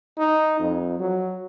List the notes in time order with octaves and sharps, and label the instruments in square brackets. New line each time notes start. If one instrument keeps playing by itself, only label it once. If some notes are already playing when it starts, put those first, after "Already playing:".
[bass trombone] D#4
F2
F#3